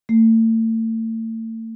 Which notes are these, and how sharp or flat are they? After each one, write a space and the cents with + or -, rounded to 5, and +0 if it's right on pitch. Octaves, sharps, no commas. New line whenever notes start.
A3 +40